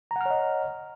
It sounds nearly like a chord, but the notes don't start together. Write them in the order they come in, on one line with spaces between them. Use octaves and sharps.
A#5 F#5 F6 C#5 D#5